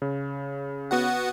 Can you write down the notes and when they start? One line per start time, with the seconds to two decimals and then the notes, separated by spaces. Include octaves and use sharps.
0.02 C#3
0.91 B3 F#4 F#5